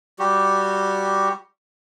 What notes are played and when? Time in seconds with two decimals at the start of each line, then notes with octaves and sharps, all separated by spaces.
0.19 G3 F#4 G4